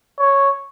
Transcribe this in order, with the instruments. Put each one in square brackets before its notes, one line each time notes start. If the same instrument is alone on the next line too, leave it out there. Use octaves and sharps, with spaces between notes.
[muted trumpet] C#5